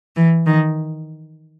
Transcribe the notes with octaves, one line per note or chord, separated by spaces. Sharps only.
E3
D#3